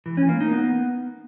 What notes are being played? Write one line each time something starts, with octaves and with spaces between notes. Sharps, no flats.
E3
C#4
A#3
D#4
B3